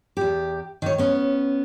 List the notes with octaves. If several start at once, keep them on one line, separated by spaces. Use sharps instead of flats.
E2 G4
D#3 C#5
B3 C#4